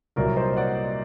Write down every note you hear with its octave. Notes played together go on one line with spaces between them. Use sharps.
C2 A#2 F#3 A#3 A#4 D5
C5 D#5
D#5
D5 F#5